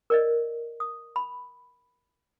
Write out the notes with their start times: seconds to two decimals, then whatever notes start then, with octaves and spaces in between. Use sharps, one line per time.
0.10 A#4 D5 D#5
0.80 D#6
1.16 B5